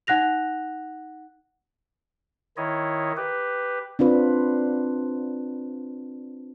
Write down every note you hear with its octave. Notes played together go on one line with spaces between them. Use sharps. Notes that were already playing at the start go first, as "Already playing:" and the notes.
D#4 F#5 F#6 A#6 F7
D#3 E4 C#5 D#5
G4 B4
C4 D4 F4 B4